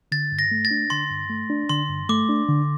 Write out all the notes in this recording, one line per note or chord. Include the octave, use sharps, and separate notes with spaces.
D3 A6
G2
A#6
A3
A6
D4
D3 C6
G2
A3
D4
D3 C6
G2
A3 D6
D4
D3